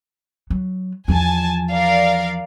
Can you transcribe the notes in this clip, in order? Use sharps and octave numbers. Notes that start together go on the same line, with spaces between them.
F#3
E2 F3 G#5 A5
A#4 D5 F5